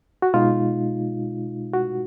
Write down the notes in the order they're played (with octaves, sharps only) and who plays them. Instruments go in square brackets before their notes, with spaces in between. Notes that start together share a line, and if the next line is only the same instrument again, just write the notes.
[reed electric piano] F#4
B2 G#3 D#4 F4
F#4